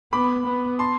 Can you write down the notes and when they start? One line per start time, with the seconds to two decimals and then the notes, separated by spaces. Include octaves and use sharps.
0.13 B3 B5 D6
0.46 B3
0.79 A5 C6